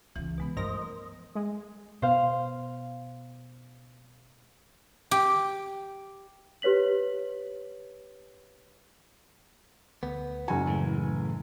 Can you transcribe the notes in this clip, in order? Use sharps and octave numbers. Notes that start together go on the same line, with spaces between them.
C#2 C#3 E3
B2 G#3 B3
G2 F3 A3 A#4 C5 D#5 A#6
G#3
B2 C5 F5
G4
G4 B4 C#5 B6 F#7
D2 B3
F#1 F#4 G#5
A2 C#3 E3